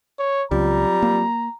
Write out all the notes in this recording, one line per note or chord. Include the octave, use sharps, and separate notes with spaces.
C#5
C#2 F#3 G3 C4 F4 A#5
A#3